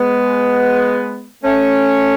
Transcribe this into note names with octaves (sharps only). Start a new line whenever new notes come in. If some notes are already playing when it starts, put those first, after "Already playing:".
Already playing: G#3 B3
A3 C#4